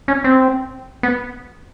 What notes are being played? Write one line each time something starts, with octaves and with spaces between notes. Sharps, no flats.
C#4
C4
B3